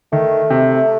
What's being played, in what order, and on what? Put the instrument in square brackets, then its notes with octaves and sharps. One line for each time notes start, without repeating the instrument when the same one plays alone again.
[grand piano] D#3 [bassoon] A3
[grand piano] C3